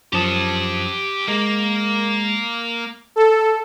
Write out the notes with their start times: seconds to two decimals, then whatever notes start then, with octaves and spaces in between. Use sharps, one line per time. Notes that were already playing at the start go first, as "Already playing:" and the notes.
0.13 F#2 F3 G4 A5 D#6
1.28 G#3 A#3
3.16 A4